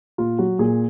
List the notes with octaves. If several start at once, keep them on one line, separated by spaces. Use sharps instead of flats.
A#2 F4
F#3 F#4
A#2 G#4